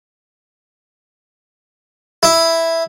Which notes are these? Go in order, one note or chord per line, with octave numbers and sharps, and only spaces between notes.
E4